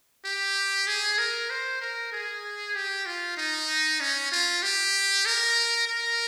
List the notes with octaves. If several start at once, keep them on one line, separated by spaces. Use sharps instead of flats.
G4
G#4
A#4
C5
A#4
G#4
G4
F4
D#4
C#4
F4
G4
A#4
A#4